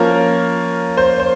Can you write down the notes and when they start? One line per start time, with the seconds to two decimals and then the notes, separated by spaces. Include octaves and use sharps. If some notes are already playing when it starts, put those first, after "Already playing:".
Already playing: F3 A#3 C#4 A#4
0.97 C5
1.20 C5